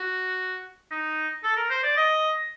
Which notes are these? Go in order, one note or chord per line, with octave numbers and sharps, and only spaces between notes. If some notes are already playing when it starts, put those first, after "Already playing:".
Already playing: F#4
D#4
A4
A#4
C5
D5
D#5